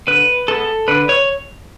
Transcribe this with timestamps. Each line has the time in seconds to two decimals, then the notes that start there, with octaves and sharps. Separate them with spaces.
0.07 D3 B4
0.48 G#3 B3 A4
0.88 D3 B4
1.09 C#5